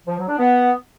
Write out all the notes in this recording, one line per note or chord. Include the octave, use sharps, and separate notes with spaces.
F3
F#3
D4
B3